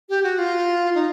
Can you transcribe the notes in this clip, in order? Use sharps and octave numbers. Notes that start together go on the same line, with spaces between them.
G4
F#4
F4
D#4